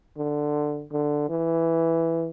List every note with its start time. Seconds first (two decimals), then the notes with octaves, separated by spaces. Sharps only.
0.18 D3
0.92 D3
1.29 E3